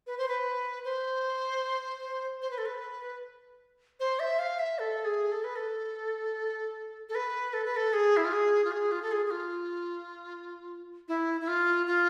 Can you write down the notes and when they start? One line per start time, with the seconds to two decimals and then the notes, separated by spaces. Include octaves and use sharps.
0.07 B4
0.18 C5
0.28 B4
0.85 C5
2.42 C5
2.51 B4
2.58 A4
2.66 B4
4.00 C5
4.20 E5
4.39 F5
4.59 E5
4.79 A4
5.05 G#4
5.32 A4
5.44 B4
5.56 A4
7.09 A4
7.15 B4
7.54 A4
7.65 B4
7.76 A4
7.93 G#4
8.17 E4
8.25 F4
8.33 G#4
8.64 F4
8.72 G#4
8.92 F4
9.02 A4
9.11 G#4
9.26 G#4
9.31 F4
11.08 E4
11.41 E4
11.48 F4
11.87 F4